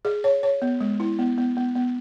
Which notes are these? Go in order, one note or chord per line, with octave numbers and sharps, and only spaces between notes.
G#4
C#5
C#5
B3
G#3
E4
B3
B3
B3
B3